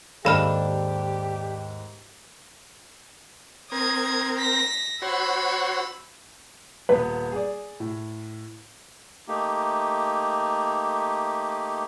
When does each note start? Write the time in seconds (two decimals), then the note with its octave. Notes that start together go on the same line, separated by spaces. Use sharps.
0.25 D#2 G#2 D4 G4 A4 F5 B5 F6
3.72 C4 A#4 D#6 G#6
4.39 A#6 B6
5.02 F#4 C5 C#5 B5 E6
6.89 D#1 B3 B4
7.32 G#4 D5
7.80 A2
9.28 A3 A#3 D#4 G4